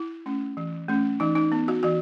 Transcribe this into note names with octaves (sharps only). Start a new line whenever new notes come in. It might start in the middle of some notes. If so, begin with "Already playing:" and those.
Already playing: E4
A3 C#4
E3
A3 C#4
E3 D#4
D#4
B3
F#4
E3 F#4